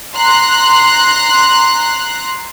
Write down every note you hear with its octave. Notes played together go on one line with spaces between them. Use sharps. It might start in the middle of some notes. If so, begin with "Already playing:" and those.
A#5 C6 F#6